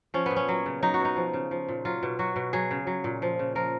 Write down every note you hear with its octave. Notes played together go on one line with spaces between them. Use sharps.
F3 C#4
A#2 B3
C#4
F#3
C#3
F#3 D#4
F#4
B2 D#4
F3
C#3
F3
A#2
F#3 F4
B2
F#3 F#4
B2
F#3 G#4
C#3
F#3
A#2
F3
C#3
F3 A#4